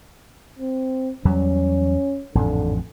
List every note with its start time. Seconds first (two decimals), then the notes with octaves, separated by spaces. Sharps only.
0.59 C4
1.25 E2 F#3 G3 C#4
2.35 A1 F2 G#2 D3